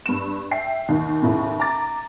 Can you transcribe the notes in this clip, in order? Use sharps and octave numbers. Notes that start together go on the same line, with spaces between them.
G2 E7
E5 G5 C7
D#2 D#3
D#2 A2 C#3
A#5 D6 A6